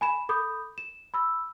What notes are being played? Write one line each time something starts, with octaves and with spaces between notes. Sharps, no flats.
G#5 B5 E7
A4 B5 D6 D#6 G6
E7
B5 E6